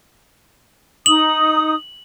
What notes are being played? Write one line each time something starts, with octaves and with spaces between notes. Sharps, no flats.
D#4 D#6 F#7